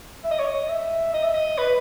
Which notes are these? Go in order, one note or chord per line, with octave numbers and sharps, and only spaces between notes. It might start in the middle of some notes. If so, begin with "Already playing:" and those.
E5
D#5
C#5
D#5
E5
D#5
E5
D#5
B4